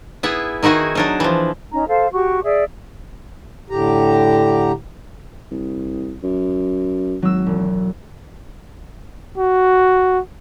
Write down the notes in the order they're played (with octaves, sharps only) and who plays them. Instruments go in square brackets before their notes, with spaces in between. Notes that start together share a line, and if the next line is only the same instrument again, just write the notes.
[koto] B3 E4 G#4
D#3 D#4 E4 F#4 G#4
F#3 D4 D#4
E3 F3
[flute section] C#4 D#4 A#5
A4 C5 F5
F#4 G4 C#6
G#4 D5 E5
[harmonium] A2 D3 G4 A#5
[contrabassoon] C2
F#2
[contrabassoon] G#1 [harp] F#3 E6
[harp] E1
[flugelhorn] F#4